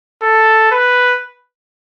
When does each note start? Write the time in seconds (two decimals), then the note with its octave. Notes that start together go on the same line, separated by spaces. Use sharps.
0.22 A4
0.71 B4